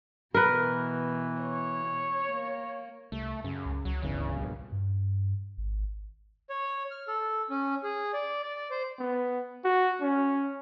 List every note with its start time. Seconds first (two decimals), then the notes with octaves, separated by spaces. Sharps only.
0.34 B2 E3 A#4 B4
1.43 C#5
2.29 A#3
3.12 C2 A3
3.44 F#2 C#3
3.66 C#2
3.85 C#2 F#3
4.02 D1 G1 E2 C#3
4.34 A#1 G2 B2
4.72 G2
5.57 G#1
6.50 C#5
6.91 F6
7.08 A4
7.50 C#4
7.84 G#4
8.13 D5
8.43 D5
8.71 C5
8.99 B3
9.64 F#4
10.02 C#4